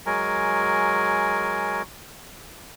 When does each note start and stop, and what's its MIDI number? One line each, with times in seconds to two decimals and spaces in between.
0.06 1.82 54
0.06 1.82 56
0.06 1.82 70
0.06 1.82 80